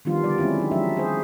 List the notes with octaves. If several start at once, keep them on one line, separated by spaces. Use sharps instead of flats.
D#3 F3 G3 B3 D4 F4
D3 G3 D5
F#3 G#3 C4 C#4 E4
F#3 D#4
F3 F#3 G#3 D4 E5
G#4 C5